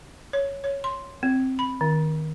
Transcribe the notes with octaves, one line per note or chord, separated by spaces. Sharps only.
C#5
C#5
C6
C4
B5
D#3